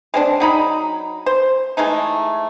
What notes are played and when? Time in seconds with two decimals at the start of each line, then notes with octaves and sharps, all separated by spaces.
0.14 G#3 C4 D4
0.40 F#3 D#4 B5
1.26 C5
1.77 E3 G#3 A3 D#4